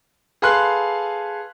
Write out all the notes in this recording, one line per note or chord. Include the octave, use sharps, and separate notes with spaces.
G#4 A4 B4 F5 C6 F#6